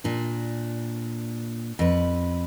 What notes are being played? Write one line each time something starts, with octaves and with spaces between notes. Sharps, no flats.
A#2 D4
F2 B4